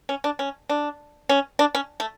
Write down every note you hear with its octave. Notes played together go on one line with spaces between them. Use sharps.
C#4
D4
C#4
D4
C#4
D4
C#4
A3